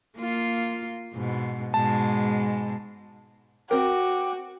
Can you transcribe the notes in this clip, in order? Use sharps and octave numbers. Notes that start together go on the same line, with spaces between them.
A#3 F4
G#2 B2
G#2 B2 G#3 A5
C4 F#4 A#4 G5 D6